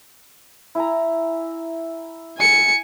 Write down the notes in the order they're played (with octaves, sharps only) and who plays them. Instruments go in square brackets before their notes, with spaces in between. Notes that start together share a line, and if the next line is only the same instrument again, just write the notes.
[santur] E4 G#5 A#5
[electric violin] G#5 C#7